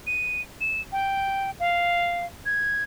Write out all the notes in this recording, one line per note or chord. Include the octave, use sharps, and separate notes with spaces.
D#7
E7
G5
F5
G#6